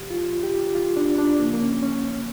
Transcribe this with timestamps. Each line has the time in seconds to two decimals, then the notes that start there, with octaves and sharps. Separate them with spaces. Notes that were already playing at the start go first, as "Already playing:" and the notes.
Already playing: A#2 F3 G4
0.10 F4
0.43 G4
0.75 F4
0.97 D4
1.18 D4
1.39 C#3 F3 A#3
1.54 A#3
1.61 C#4
1.83 C#4
2.05 C#4